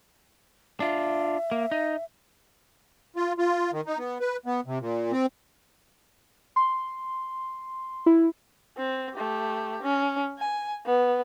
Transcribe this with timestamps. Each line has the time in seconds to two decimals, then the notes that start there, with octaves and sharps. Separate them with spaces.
0.80 D4 F4 E5
1.52 A#3
1.71 D#4
3.16 F4
3.38 F4
3.73 D#3
3.86 D#4
3.98 B3
4.20 B4
4.46 B3
4.66 C3
4.81 A#2
5.12 C4
6.56 C6
8.06 E4
8.77 C4
9.14 A3 G4
9.82 C#4
10.39 G#5
10.86 B3